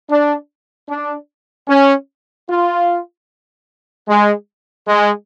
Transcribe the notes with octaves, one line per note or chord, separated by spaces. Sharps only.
D4
D4
C#4
F4
G#3
G#3